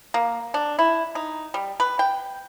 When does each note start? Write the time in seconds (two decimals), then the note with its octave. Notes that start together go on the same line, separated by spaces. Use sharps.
0.14 A#3
0.54 D4
0.79 E4
1.15 D#4
1.54 G3
1.80 B4
1.99 G5